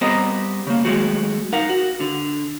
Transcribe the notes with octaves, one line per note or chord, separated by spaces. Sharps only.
G3 B3 C4 A#4 C5 D#5
C#3 A#3
D#2 F#3 G#3 A3 F#4
D#4 A#4 F5 F#5
F#4
D3